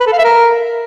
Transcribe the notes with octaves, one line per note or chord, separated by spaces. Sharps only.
B4
A4
F5
E5
A#4